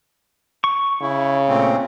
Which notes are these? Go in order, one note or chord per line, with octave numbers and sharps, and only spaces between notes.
C#6
C#3 E4
A#2 A3 C4